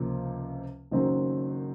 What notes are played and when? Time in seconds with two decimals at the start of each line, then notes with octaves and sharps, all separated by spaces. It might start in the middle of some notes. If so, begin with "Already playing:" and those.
Already playing: C#2 C3 F3 A#3
0.91 F#1 F#2 D#3 F#3 C4